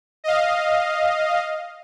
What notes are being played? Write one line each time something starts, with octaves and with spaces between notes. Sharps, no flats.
D#5 F5